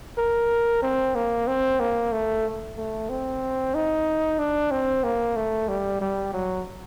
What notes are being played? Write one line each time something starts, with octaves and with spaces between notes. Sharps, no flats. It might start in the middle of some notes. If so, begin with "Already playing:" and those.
A#4
C4
A#3
C4
A#3
A3
A3
C4
D#4
D4
C4
A#3
A3
G3
G3
F#3